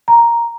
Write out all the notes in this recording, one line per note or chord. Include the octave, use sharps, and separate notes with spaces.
A#5